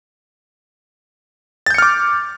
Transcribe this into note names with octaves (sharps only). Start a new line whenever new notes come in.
D6 F6 G6 A6 C#7